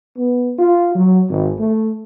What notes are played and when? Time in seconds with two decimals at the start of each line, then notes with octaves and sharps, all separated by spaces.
0.17 B3
0.59 F4
0.94 F#3
1.30 G#1
1.59 A3